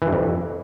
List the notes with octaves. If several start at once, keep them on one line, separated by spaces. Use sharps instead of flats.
E3
G2
F2